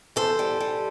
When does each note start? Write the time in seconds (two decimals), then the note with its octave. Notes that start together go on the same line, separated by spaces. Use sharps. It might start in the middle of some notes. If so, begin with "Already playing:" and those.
0.16 E2 A4 C5
0.39 G3
0.60 G3